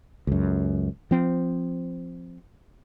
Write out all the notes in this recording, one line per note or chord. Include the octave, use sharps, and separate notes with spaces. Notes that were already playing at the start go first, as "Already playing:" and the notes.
C#2 F#2
F3 C4